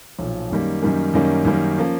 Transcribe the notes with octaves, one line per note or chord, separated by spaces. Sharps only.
B1 A#2 F3
F#2 D#3 G3 A#3 C#4
F#2 D#3 G3 A#3 C#4
F#2 D#3 G3 A#3 C#4
F#2 D#3 G3 A#3 C#4
F3 A#3 C#4